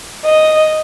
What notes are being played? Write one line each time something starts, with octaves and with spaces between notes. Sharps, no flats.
D#5